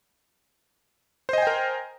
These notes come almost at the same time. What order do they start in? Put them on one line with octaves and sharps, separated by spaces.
C5 D#5 G#5 G5 A#4